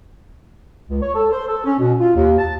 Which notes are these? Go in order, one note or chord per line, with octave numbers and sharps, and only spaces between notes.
C#2
C#5
A4
C5
A4
C#4
B2
F4
D#2
A5